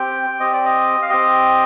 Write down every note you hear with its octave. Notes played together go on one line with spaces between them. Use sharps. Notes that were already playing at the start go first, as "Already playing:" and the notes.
Already playing: C4 G4 G5
C4 G4 D#5
D5
D#5
F5
C4 G4 D#5